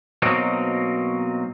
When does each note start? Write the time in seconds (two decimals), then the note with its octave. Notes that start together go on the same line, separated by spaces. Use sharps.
0.22 B2 F#3 A#3 C4 D#4